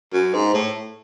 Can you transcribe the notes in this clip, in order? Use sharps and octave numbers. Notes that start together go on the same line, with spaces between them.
F#2
G#2
A2